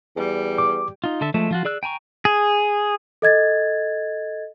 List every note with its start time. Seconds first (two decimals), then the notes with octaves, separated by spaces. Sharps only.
0.16 E2 G3
0.58 D6
1.04 D#4 F4
1.21 D3 A4 E5
1.34 F3 G#3 A3 E5
1.51 F3 F4 F#4
1.65 G#4 D5 E6 F#6
1.83 G5 G#5 A#5 C#6
2.25 G#4
3.22 A4 D#5 G#6 A6